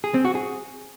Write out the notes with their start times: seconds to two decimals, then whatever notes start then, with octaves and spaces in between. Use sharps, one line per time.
0.04 G#4
0.14 C4
0.25 F#4
0.35 G#4